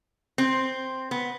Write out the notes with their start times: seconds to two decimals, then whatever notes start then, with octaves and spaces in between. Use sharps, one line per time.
0.38 C4
1.11 B3